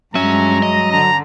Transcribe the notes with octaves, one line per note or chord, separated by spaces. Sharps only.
G2 F#3 G#3 C#4 E5 A#5
D#5
D3 A#5